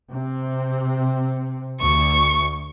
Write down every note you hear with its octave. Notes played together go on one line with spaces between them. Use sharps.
C3 C4
D2 C#6